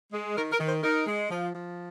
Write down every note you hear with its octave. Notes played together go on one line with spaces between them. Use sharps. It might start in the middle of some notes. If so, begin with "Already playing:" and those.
G#3
D#3 A#4
A#4
D#3
C5
D#4 A#4
G#3
F3
F3